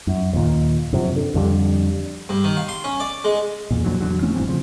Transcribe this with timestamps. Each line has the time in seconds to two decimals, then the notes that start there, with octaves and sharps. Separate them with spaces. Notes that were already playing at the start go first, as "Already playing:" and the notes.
0.07 F#2
0.33 D#2 A#2
0.93 F#2 C3 F3
1.16 D3
1.34 F2 D3 G3
2.29 G2
2.44 D#3
2.57 F5
2.68 C6
2.84 C#4
3.00 D5
3.24 G#3
3.71 E2 A#2
3.84 A#2 D3 F3 F#3
4.00 E2 D3 F#3
4.22 E3 A3 C4 C#4
4.34 D#1 G2 E3 C4
4.49 C#3 F3